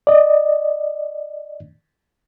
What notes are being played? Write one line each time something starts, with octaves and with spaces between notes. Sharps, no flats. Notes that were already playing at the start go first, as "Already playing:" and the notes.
D5 D#5